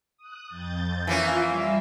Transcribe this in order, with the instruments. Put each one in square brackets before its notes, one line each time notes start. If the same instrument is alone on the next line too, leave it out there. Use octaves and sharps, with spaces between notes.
[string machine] D#6 F#6
F2 G6 A6
[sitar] E3 A#3 C#4 [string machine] F4 F5
[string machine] G3 E6